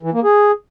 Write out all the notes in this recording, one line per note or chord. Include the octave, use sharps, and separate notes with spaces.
E3
A#3
G#4